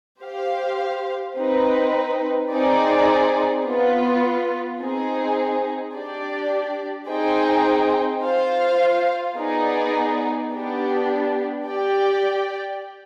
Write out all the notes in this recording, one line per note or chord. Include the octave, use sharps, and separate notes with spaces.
G4 C5 F5
C4 D#4 B4
C4 D#4 G#4 D5
B3 F4 B4
C4 D#4 G#4
D4 G4 D5
C4 D#4 G#4 C5 G5
F4 C5 F5
B3 D#4 G#4 D5
B3 D4 G4
G4 D5 G5